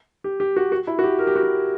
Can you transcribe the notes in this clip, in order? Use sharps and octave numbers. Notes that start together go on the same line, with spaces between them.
G4
G4
F#4
F#4
E4
F#4
G4
A#4
G4
F#4
G4